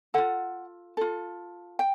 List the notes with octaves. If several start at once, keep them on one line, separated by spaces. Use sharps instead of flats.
F4 A4 F#5
F4 A4
G5